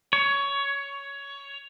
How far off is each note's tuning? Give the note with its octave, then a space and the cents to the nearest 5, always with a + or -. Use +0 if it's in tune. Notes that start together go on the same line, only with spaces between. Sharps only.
C#5 +15